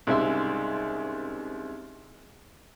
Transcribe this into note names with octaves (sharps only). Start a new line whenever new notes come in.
C2 G#2 C#3 E5 C6